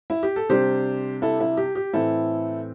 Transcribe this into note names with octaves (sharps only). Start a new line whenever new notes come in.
E4
G4
A4
C3 G3 D4 G4 C5
E4 A4
E4
G4
G4
A2 E3 C4 E4 A4